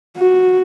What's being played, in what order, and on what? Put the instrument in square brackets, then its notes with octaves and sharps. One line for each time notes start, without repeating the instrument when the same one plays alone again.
[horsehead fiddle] F#4